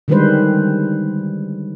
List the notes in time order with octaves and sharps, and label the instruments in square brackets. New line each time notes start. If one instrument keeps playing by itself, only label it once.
[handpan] D3 D#3 G3 G#3 B4 C5